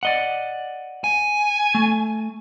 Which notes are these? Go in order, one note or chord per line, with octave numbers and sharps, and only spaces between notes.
D5 D#5 F#5
G#5
A3